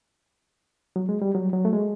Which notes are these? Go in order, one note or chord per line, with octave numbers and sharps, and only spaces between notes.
F#3
G#3
G3
F#3
F#3
A3
G#3